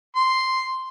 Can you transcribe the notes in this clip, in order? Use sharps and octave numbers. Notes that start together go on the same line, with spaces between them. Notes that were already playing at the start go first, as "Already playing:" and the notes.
C6